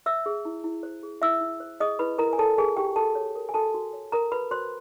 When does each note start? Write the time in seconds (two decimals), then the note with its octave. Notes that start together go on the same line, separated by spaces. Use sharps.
0.06 C5 E5 E6
0.26 G#4
0.45 E4
0.64 E4
0.83 C5
1.03 G#4
1.22 E4 E5 E6
1.41 E4
1.60 C5
1.80 G#4 D#5 D#6
1.99 E4 B4 B5
2.18 E4 A#4 A#5
2.33 G#5
2.38 A4 C#5 A5
2.58 G#4 A#4 G#5
2.77 F#4 G4 G5
2.96 F#4 A4 A5
3.15 C#5
3.35 A#4
3.49 G#5
3.54 F#4 A4 A5
3.74 F#4
3.93 C#5
4.12 A#4 A#5
4.31 F#4 B4 B5
4.51 F#4 C5 C6